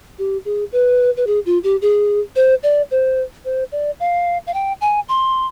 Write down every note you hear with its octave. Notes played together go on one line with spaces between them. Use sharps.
G4
G#4
B4
B4
G#4
F4
G4
G#4
C5
D5
C5
C5
D5
F5
F5
G5
G#5
C6